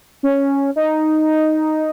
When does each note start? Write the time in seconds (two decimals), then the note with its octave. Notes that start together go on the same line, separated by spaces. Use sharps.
0.23 C#4
0.76 D#4